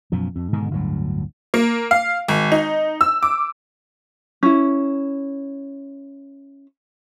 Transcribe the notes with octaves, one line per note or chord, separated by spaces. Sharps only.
F#2 B2 F3
F2
G#2 B2 D3 D#3
G1 D2 A2 F#3
A#3
F5
G#1
D#4
E6
D6
C#4 E4